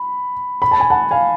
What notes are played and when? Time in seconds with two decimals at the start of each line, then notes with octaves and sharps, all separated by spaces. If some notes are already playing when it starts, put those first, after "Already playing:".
Already playing: B5
0.62 B5
0.71 A5
0.80 G#5
0.90 F#5 A5
1.11 F5 G#5